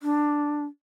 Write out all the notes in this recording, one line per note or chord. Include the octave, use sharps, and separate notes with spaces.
D4